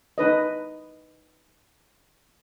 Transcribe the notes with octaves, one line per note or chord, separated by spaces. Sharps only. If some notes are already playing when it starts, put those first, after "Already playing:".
D#4 B4 D#5